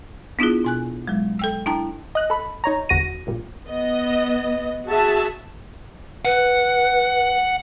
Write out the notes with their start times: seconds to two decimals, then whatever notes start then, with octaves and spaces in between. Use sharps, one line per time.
0.39 B3 D4 E4 F4 G#4
0.65 B2 G#5 F#6
1.08 F#3 G#3
1.39 A4 G5 E6
1.66 D4 E4 G5 A5 A#5
2.15 D#5 F#6
2.30 A4 B5
2.64 D#4 C#5 A#5
2.89 G1 E2 F#4 A#6 D#7
3.27 A#1 G2 A#2
3.67 B3 D#5
4.86 F#4 G#4 E5 A5
6.25 B4 F#5